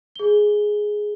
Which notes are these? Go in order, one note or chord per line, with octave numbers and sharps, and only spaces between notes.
G#4 G7